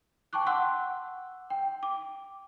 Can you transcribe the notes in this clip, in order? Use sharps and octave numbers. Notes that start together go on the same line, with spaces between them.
G5 A5 C#6 D6 F#6
F#5 C6 D6 E6 F#6
G5
D6